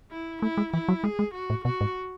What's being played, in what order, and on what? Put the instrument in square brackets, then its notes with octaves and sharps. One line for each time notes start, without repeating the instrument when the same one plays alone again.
[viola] E4
[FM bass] A3 [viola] E4
[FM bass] G#3
[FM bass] E3 [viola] E4
[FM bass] F#3
[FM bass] G#3 [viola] G#4
[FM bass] G#3
[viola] F#4
[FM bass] A2
[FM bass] B2 [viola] F#4
[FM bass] G#2